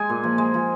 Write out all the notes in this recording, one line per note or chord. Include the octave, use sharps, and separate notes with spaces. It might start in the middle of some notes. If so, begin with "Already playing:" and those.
Already playing: G#3 G#5
A#2
F3
G#3
F3